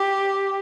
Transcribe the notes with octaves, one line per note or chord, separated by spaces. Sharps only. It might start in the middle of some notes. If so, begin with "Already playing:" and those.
Already playing: G4